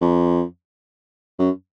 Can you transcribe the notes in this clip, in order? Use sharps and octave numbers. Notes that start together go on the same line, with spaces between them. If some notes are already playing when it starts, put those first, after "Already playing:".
F2
F#2